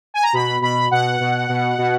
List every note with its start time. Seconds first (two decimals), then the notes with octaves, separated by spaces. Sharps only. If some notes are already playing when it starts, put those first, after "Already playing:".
0.14 G#5
0.23 A#5
0.33 B2 B5
0.61 B2 B5
0.91 B2 F#5
1.20 B2
1.49 B2
1.78 B2